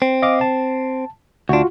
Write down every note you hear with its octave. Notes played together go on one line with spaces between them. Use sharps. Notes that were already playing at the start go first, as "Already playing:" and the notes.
C4
D#5 F5 D6
A5
D2 D4 F4 F#4